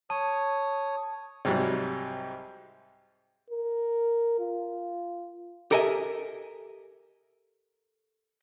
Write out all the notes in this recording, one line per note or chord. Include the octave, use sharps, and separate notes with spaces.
C#5 A5 D#6
C2 G#2 F#3 G3
A#4
F4
G4 A4 A#4 D#5 E5 G#5